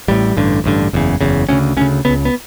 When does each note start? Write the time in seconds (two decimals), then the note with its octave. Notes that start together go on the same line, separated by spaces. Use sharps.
0.08 A1 A2 G3
0.37 A1 G2 D3
0.64 A1 G2 D3
0.93 F#1 E2 C#3
1.21 F#1 E2 C#3
1.49 D2 C#3 C#4
1.77 D2 C#4
1.81 C#3
2.05 C#2 C#3 B3
2.25 B3